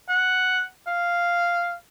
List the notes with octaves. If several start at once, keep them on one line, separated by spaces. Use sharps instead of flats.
F#5
F5